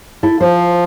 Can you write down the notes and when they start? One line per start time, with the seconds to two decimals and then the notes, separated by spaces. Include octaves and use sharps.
0.23 E4 A4
0.41 F3 C5